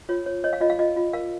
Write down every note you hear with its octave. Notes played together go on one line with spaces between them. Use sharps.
F4 C#5
C#5
C#5 D#5
F5
F4 D#5
F5
F4 D#5
F4
A#4 F5